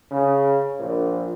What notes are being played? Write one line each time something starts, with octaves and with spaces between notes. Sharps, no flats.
C#3
A#1